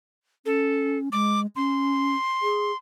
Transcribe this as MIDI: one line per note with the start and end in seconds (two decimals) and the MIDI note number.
0.46 1.09 61
0.46 0.98 69
1.12 1.46 56
1.12 1.40 86
1.56 2.15 61
1.56 2.77 84
2.42 2.71 68